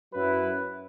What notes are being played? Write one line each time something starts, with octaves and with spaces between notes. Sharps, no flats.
F#2 F#3 E4 B4